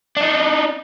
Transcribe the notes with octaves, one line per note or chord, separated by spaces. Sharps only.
D4 D#4